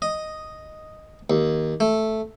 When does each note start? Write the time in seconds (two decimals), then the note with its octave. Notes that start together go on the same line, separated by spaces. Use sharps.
0.02 D#5
1.30 D#2
1.80 A3